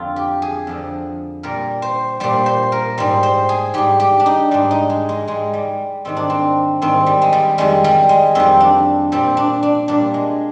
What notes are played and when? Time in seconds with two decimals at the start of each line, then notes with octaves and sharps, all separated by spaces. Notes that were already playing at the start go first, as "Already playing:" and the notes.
Already playing: F2 D3 F4
0.16 G4
0.42 G#4
0.67 F2 D3 F3
1.43 A#2 G3 A#4
1.82 C5
2.20 A#2 G3 C5
2.46 C5
2.72 A#4
2.98 G#2 G3 C5
3.23 C5
3.49 G#4
3.74 G#2 G3 G4
4.00 G4
4.20 D4
4.26 D#4
4.51 G#2 G3 D4
4.71 D#4
4.90 G#3
5.09 G#3
5.28 G#2 G3 G#3
5.54 G3
6.05 G#2 D#3 G3 C4
6.17 D4
6.30 C4
6.82 G#2 D#3 G3 C4
7.06 G3
7.22 G#3
7.32 G3
7.58 F2 D#3 G3 G#3
7.84 G3
8.09 G#3
8.35 F2 D#3 G3 C4
8.60 D4
9.12 A#2 G3 C4
9.37 D4
9.63 D4
9.88 A#2 G3 D4
10.14 G#3